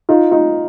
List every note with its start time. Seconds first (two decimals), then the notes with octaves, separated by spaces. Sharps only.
0.09 D#4 F4
0.31 D#4 F4